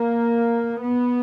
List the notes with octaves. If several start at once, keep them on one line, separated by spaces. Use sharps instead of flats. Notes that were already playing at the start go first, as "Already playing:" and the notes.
Already playing: A#3
B3